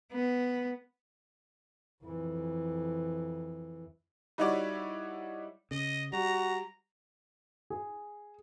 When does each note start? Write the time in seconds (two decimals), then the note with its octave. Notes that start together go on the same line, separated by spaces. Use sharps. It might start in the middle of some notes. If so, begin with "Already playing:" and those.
0.13 B3
2.03 F2 E3
4.38 G3 D#4 E4 F#4 C#5 D5
5.71 C#3 D#5
6.13 G3 F#4 A#5
7.70 G#4